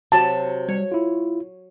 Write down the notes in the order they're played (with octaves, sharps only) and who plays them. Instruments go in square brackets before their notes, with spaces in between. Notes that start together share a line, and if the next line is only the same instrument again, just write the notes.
[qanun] C3 F#3 [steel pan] A5
[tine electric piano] G3 [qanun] C#5
[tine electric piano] E4 F4